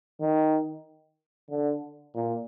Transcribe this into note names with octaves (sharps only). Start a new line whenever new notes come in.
D#3
D3
A#2